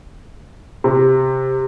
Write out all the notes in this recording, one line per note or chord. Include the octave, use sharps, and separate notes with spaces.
C3